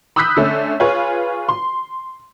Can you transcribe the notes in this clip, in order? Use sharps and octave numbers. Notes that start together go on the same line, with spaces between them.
B5 D#6 E6 F#6 G6 B6
D3 A3 C#4
F4 G#4 B4 C#5
C6